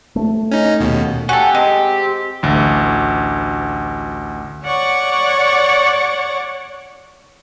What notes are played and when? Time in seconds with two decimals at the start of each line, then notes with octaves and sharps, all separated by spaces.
0.16 A3
0.52 C#4 D#4
0.80 D#2 B2
1.29 F#4 G4 A4 G#5
1.55 G#3 C4
2.43 A1 D2
4.64 C#5 D5 F#5 C#6 D6